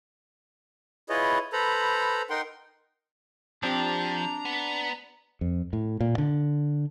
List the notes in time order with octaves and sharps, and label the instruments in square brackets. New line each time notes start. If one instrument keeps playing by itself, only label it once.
[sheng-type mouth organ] E4 F4 G#4 B4 C#5 D#5
A4 B4 C5 A#5 B5
D#4 A#4 F#5 G5 C6
[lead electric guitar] F3 [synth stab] C4 G4 [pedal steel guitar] D4 [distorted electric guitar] A#5
[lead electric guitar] B3
[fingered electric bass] F2
A2
A#2
D3